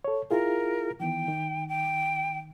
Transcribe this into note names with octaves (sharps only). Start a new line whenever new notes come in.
A4 C#5
E4 F4 G#4 A#4
D#3 E3 B3 G5
D#3
G5